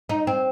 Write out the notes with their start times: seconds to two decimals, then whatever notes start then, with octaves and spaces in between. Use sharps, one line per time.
0.09 D#4
0.27 C4